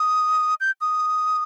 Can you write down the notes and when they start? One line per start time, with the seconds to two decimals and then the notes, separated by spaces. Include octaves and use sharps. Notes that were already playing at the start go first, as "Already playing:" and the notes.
Already playing: D#6
0.61 G6
0.81 D#6